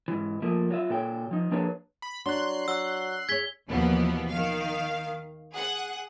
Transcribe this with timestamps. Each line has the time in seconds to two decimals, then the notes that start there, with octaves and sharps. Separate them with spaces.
0.08 G#2 E3
0.42 F3 A3 A#3
0.70 F#3 F4 E5
0.90 A#2 F#4 A4 C#5 G5
1.31 F3 D#4
1.51 F3 A#3 D4 G#4 B4 C#5
2.02 B5
2.26 F#3 D4 C6 F#6
2.68 F#3 E6
3.29 G#4 C#5 G#6 B6 G7
3.68 D#2 B2 E3 F3 B3
4.29 D#3 F5
5.52 G#4 F#5